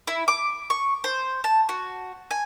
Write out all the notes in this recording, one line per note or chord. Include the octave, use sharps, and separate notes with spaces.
E4
D6
C#6
C5
A5
F#4
G#5